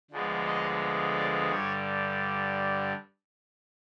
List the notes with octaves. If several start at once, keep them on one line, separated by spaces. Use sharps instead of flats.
D2 D3 F3 G#3 B3
D#5
D5
G2 D3 G3 C#5